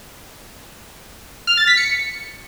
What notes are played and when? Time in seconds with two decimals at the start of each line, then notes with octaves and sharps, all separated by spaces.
1.47 F6
1.57 A6
1.67 B6
1.77 C#7